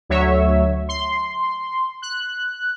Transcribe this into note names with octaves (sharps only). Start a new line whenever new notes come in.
D2 F#3 C#5 E5
C6
F#6